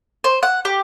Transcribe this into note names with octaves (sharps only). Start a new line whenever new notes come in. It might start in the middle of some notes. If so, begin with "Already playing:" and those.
C5
F#5
G4